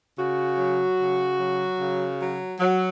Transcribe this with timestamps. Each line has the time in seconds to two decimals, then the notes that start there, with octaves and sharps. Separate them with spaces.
0.18 C#3 F#4
0.58 F#3
0.99 C#3
1.39 F#3
1.79 C#3
2.20 F#3
2.60 F#3